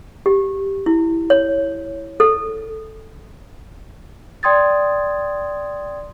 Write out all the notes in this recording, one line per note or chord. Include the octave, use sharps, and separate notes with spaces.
G4
E4
C#5
A4
D5 G5 C6 D#6 G#6 A6